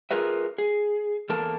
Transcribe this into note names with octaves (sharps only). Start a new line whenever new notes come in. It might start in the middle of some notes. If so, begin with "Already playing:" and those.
F4 G#4 A#4 B4 E5
G#4
E2 A#3 A4 A#4 A5